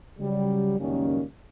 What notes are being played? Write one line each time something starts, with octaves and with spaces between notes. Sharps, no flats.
C#3 F#3 G3
C#2 F#2 D#3 G3 A#3 C#4